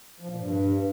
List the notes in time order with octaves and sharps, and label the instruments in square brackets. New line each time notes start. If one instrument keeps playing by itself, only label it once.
[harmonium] F3
A#2
G2